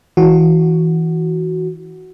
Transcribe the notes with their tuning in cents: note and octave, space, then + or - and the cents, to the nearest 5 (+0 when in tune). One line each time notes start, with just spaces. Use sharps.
E3 -20 F#4 +0